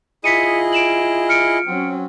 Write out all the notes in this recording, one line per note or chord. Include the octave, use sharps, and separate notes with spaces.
E4 F4 G#4 D#5 B6 C#7 D#7
D7 E7 F#7
F6 C#7 D7
F#3 C4 C#4